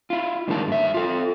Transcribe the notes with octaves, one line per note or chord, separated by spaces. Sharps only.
E4 F4
G2 D3 D#3 G#3 A#3 A5
G2 E5
F4 A4